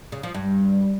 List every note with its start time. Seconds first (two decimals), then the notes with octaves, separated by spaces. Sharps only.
0.12 C#3
0.23 F3
0.34 G2